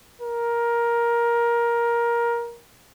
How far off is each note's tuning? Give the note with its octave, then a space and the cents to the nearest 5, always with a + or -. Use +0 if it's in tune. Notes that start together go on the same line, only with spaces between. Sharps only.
A#4 +15